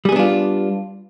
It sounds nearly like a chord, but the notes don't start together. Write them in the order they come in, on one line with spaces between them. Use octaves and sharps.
G3 G#4 B3 D4 F4